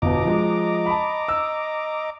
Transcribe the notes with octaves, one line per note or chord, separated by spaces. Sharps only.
G1 B2 D#5 A#5 D6
F3 G#3
A5 B5
E6